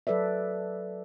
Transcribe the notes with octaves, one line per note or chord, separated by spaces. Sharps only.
F#3 A4 B4 D5 E5